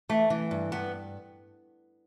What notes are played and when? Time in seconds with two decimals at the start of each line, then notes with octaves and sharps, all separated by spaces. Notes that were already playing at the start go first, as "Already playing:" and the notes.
0.09 E3 A3
0.30 E3
0.51 G2
0.72 G2 B3